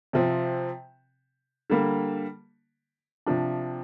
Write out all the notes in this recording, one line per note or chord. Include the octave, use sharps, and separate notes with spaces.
C3 F3 C4
D3 G3 A#3
C3 F3 D4